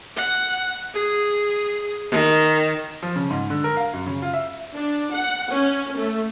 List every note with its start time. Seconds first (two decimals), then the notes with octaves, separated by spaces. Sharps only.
0.16 F#5
0.94 G#4
2.10 D#3
3.02 F3
3.16 C#3
3.30 G#2
3.50 D3
3.64 A#4
3.77 F5
3.93 F#2
4.06 C#3
4.22 F4
4.33 E5
4.75 D4
5.13 F#5
5.51 C#4
5.98 A3